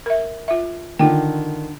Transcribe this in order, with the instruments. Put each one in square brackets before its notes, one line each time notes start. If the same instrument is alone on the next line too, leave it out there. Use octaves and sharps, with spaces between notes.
[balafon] A#4 E5
F4 E5
[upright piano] D3 D#3 [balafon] F4 G5